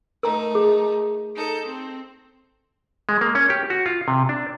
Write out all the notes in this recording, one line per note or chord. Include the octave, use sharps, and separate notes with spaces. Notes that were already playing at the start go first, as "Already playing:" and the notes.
A3 D#4 A#4 A#5
G#4
D#4 A4 G6
C4
G#3
A#3
C#4
G4
F#4
F4
C3
D4